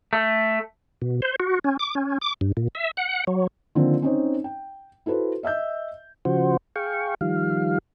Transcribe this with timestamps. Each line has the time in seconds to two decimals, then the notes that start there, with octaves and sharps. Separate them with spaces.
0.13 A3
1.02 B2
1.22 C5
1.40 F#4
1.64 C#4
1.79 D6
1.95 C#4
2.21 D6
2.41 G2
2.57 A#2
2.75 E5
2.97 F#5
3.27 F#3
3.75 D3 D#3 F3 A#3 C4
4.02 C4 C#4 D#4 C5 C#5
4.44 G5
5.06 E4 F#4 A4 B4 C5
5.43 D#5 E5 E6 G6
6.25 C#3 F3 F#4 C5
6.76 G#4 F5 G5 C#6
7.21 D#3 F3 G3 F5